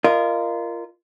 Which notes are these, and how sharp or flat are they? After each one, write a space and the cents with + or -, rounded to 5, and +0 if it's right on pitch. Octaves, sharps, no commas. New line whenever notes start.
F4 -25 A#4 +0 D#5 -35